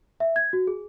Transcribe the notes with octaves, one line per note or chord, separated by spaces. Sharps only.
E5
G#6
F#4
G#4